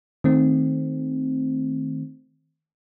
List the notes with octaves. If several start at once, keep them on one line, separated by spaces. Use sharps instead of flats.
D#3 A3 C4